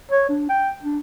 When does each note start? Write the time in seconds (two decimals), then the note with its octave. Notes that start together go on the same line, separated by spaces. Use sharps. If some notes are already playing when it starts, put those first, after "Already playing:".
0.11 C#5
0.29 D4
0.49 G5
0.83 D4